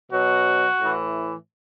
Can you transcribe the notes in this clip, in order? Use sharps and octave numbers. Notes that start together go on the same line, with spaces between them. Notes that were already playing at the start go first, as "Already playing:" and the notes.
B2 F#3 F#4
A2 E3